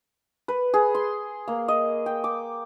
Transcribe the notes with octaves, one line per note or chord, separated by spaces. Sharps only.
B4
G#4
C6
A#3
D#5
G5
D6